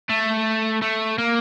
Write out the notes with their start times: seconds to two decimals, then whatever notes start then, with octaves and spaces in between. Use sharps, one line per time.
0.10 A3
0.82 A3
1.18 A#3